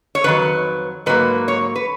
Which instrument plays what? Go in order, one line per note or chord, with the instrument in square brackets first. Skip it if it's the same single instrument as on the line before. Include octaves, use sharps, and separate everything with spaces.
[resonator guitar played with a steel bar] C#5
F2 D#3 F#3 B4
G#2 F#3 A#3 B4
C#5
B4